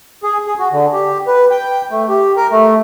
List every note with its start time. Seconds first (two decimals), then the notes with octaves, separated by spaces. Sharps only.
0.23 G#4
0.46 G#4
0.59 F#4
0.72 D3
0.93 G4
1.27 B4
1.51 G5
1.91 A3
2.09 G4
2.37 A#4
2.51 A3